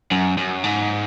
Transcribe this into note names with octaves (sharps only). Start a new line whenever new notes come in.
F#2
F#2
G#2